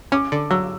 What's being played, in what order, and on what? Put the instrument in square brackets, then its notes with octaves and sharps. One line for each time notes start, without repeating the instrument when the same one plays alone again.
[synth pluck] C#4 [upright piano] D6
[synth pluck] D3
[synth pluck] F#3 [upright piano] E6